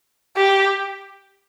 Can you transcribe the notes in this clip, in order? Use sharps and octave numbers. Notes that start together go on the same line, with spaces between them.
G4